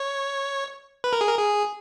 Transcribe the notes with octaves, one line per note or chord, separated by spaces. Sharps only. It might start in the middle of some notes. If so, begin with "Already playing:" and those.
Already playing: C#5
B4
A#4
G#4
A#4
G#4